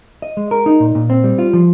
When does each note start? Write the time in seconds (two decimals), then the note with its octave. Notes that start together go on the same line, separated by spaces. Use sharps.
0.22 D#5
0.37 G#3
0.51 A#4
0.66 D#4
0.80 A#2
0.95 A#2
1.10 C4
1.24 G3
1.38 F4
1.53 F3